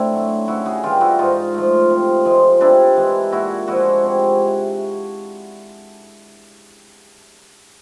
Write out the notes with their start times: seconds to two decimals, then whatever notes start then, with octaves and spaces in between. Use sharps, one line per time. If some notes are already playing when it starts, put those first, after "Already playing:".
Already playing: A2 C4 D4 E4
0.12 F#3 A3
0.48 C#3 E4 F#4
0.65 F#4 G#4
0.83 E3 G3 F4 G4
1.01 E4 F#4
1.19 G#2 D#4 F4
1.54 F3 A3
1.90 C3
2.25 F3 G#3
2.61 C3 D4 E4
2.97 E3 G#3
3.32 A#2 E4 F#4
3.67 F3 G#3 E4 F#4
4.03 C3